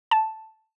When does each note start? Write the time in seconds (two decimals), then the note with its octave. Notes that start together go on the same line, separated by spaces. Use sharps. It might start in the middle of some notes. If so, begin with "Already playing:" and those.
0.11 A5